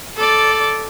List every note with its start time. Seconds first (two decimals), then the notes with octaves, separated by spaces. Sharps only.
0.17 A4 D5